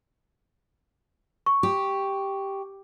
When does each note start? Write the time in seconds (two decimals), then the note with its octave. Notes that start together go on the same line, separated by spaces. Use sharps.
1.46 C#6
1.63 G4